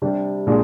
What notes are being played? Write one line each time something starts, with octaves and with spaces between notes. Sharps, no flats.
C3 G3 D4 G4
A#2 G#3 D4